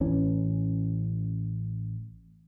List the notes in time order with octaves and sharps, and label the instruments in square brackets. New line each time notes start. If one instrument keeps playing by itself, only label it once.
[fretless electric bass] A1 E3 C#4